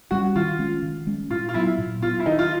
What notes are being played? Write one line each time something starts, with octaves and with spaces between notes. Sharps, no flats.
G3 A#3 C#4 F#4
D#3 F4
G#3 C#4
D#3
G#3 C#4
A#2 F4
F4
F#3 B3 E4
A#2
F#3 B3 F4
E4
D#3 D#4
F4